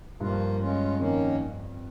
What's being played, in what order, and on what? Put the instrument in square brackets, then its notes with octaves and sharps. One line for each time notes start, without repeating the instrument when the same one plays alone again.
[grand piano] G2 [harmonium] F3 A#3 F4
[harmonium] G#3 C#4 F4
[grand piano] F2 [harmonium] D#3 A#3 C#4